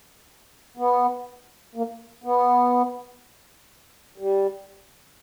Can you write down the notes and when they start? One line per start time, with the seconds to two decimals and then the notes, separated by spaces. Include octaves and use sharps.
0.77 B3
1.75 A#3
2.24 B3
4.18 G3